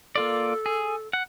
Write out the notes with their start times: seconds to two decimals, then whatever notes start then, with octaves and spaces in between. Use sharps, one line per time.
0.16 A#3 F4 A4 D5
0.66 G#4
1.13 F#5